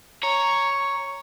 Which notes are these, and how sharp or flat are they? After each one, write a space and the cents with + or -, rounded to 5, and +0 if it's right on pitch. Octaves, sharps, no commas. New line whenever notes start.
C#5 +0 A#5 +0